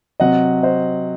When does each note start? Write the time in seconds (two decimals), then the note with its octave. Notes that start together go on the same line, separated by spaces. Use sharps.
0.20 C3 F#3 C4 D#5 F#5
0.63 C5 D#5